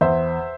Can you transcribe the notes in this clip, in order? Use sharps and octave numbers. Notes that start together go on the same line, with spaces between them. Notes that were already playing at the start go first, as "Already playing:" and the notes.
E2 C5 E5